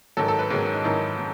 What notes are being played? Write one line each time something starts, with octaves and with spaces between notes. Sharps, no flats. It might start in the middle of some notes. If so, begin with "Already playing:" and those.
G#2 D#3 F#3 A4
A4
B4
G#2 D#3 F#3 G#4
C#4
D#4
G#2 D#3 F#3 E4
F#3